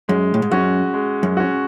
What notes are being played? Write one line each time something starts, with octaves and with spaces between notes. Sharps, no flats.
F#2 G#3
A2
G#2
F#2 C#4 F#4
G#3
F#2
C#4 F#4